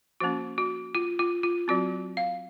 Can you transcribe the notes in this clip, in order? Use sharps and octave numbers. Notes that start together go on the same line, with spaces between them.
F3 A#3 C#4 F#4
F#4
F4
F4
F4
F#3 C4 F#4
F5